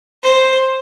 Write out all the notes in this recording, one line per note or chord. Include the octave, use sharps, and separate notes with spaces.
C5